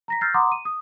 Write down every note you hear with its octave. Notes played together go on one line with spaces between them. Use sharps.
A#5 A#6 B6
E6 F6 G6 A6 A#6 C7
F#5 A#5 C6 D6 D#6
D#7
D#6